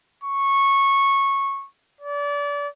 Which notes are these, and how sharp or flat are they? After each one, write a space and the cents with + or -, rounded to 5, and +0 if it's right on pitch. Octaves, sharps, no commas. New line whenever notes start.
C#6 -15
D5 -30